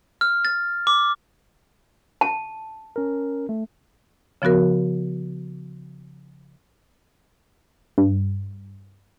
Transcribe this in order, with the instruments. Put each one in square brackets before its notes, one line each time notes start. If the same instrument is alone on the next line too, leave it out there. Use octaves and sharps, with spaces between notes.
[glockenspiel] F6
A6
D6
[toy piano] A5
[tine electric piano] C#4 A#4
A3
[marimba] C#3 F3 B3 F#4 A#4
[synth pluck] G2